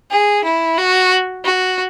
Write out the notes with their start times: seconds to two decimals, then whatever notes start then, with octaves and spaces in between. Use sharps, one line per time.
0.11 G#4
0.44 E4
0.78 F#4
1.45 F#4